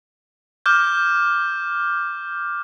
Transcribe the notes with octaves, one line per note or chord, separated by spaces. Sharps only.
D6 F6 G6